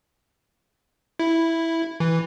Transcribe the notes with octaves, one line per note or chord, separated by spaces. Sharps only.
E4
E3